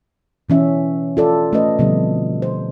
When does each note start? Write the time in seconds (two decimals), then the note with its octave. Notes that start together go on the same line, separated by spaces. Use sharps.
0.49 B2 E3 C#4 E5
1.17 F4 A4 D5
1.53 A3 C#4 F4 B4 D#5
1.79 B2 D3 F3 G3 C4 C#4
2.42 C5